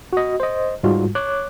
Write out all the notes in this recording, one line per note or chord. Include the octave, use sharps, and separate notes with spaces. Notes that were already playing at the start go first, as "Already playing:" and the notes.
F#4 D#5
C5 D#5
G#2 G3 G#3 F4 F#4
C#5 D6 F#6